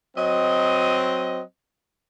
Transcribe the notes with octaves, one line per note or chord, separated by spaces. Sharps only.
F#3 C4 D#5